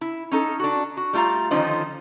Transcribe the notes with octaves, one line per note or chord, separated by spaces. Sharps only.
E4
C#4 D#4 A4
D4 F#4
F#4
G3 A3 F4 F5 A#5
D3 D#3 F3 C#4 D#4 C5